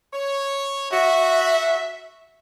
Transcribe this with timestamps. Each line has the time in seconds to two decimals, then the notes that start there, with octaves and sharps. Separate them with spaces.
0.13 C#5
0.92 F#4 E5